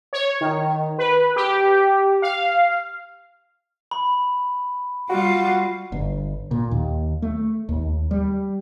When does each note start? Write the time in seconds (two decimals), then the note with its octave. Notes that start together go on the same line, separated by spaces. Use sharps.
0.13 C#5
0.41 D#3
0.98 B4
1.36 G4
2.22 F5
3.91 B5
5.09 G3 F4 F#4
5.92 G1
6.51 A#2
6.71 D#2
7.22 A3
7.69 D#2
8.11 G3